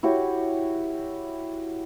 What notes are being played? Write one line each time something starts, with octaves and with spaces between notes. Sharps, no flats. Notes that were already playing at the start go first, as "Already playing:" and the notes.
E4 F#4 G4 C#5